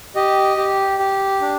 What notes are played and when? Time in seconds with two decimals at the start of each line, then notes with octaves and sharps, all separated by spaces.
0.15 G4 D#5
0.57 G4
0.99 G4
1.41 D4